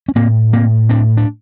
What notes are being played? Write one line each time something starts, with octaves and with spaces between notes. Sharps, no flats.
C#4
A2 A#3 C4
A2 A#3 C4
A2 C4 D4
D4